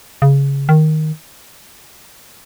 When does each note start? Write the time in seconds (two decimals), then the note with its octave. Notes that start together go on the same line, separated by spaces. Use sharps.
0.22 C#3
0.69 D#3